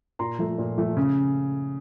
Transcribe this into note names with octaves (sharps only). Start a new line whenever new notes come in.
A#2 A#5 C6
F3 A3
A#2
F3 A3
C#3